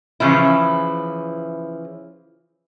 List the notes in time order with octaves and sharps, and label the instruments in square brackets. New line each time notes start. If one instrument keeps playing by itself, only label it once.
[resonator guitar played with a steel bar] C#3 E3 F3 E4